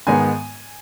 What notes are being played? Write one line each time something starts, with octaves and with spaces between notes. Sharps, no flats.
G#2 D#3 G#3 B3 G#5